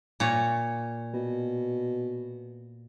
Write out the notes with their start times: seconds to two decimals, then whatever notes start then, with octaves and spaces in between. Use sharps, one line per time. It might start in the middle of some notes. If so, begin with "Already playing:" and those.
0.20 A#2 C#5
1.14 B2